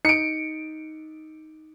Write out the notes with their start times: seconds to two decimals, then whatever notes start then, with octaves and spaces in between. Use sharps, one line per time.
0.05 D#4 C#7 D7